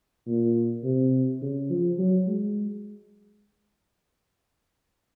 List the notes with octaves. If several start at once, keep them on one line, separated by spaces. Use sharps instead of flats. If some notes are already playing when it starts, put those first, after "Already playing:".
A#2
C3
C#3
F3
F#3
G#3